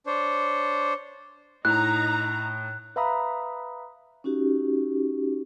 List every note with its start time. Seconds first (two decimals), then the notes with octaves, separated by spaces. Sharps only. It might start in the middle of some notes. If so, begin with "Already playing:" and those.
0.06 D4 C5 C#5
1.65 A2 D#4 A#5 F#6
2.96 B4 E5 F5 A#5 B5 D#6
4.24 C#4 D#4 F#4 G4